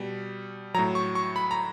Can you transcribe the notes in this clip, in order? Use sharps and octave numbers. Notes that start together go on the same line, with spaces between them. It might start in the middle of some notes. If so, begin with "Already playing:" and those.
Already playing: B2 G3
A2 F#3 A#5
C#6
C#6
B5
A#5